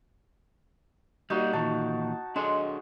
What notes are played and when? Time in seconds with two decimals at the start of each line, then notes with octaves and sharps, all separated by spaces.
1.30 G3 A#3 D#4 F#4
1.53 A#2 D#3 E3 A5
2.36 G#3 D4 A4 C#5